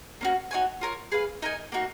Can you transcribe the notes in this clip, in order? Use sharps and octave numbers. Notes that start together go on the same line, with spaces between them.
A#3 C#4 F#4
D#4 F#4 C#5 G#5
F4 A#4 C#5
G#4 B4 F5
D#4 A#4 D#5 G#5
A#3 D#4 F#4